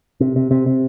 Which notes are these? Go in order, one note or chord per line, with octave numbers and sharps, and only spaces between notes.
C3
C3
C3
C3